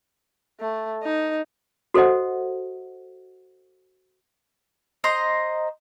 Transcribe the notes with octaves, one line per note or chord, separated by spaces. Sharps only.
A3
D#4
F#4 A4 C5 D#5 F#5
C5 D#5 A#5 C6